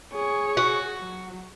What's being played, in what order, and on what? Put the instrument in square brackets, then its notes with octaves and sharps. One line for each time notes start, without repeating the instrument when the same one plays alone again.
[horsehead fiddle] G#4 C#5
[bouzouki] F#4
[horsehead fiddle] F#3